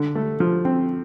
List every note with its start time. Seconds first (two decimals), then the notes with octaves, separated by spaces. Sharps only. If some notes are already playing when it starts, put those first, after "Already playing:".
Already playing: D3
0.15 A3
0.40 F3
0.65 C4